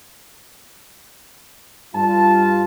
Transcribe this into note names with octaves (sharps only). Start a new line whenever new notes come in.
G2 F4 A5